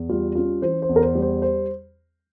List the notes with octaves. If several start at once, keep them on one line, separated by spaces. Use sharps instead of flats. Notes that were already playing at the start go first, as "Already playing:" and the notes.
Already playing: E2
G3 F4
C#4 F4
E3 C5
C5
E2
A#4
C5
G3
C5
C5